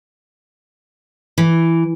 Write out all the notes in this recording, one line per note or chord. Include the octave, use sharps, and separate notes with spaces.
E3